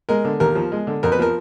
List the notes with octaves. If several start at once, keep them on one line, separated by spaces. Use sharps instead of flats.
G#3 A#4
D3
D#2 A#4
F3
G#3
D3
F2 A#4
B4
F3 A#4